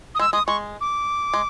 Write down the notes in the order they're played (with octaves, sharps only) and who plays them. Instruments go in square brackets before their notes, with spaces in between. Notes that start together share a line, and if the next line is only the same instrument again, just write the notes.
[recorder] D#6
[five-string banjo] G#3 [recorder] E6
[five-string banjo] G#3 [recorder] D#6
[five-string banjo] G#3 [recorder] C#6
[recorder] D6
[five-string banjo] G#3